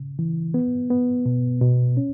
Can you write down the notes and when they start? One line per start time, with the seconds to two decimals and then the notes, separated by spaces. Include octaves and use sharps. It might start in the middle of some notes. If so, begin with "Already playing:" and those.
Already playing: C#3
0.19 E3
0.54 B3
0.90 B3
1.26 B2
1.61 B2
1.97 C#4